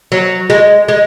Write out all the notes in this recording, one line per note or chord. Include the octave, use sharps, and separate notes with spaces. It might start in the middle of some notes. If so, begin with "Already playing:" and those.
F#3
G#3
G#3